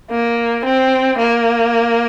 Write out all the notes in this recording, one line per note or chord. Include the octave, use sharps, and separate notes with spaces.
A#3
C4
A#3